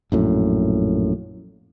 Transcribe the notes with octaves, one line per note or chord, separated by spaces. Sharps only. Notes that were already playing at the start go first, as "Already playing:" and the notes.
A#1 F#2 A2